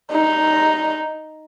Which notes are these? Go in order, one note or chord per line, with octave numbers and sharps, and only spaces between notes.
D#4